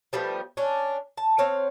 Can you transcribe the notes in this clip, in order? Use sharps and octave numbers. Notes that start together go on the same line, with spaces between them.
F3 G3 A3 B3
C#4 D4
A5
C4 C#5 F5